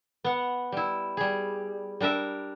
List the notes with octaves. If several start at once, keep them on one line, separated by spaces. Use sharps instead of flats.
B3 F#5
G3 E4
G3 G#4
G3 D4 A#4 E5